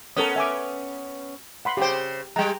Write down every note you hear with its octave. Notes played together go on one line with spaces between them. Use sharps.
B3 C#4 A4 A#4 D#6
E5 G#5 D6
F#5 B5 C6
C#3 G4 C5 G5
G3 G#3 G5 A#5